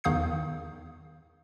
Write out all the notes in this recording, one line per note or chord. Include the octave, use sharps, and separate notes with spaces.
E2 D#3 F5 D#6 G6 C7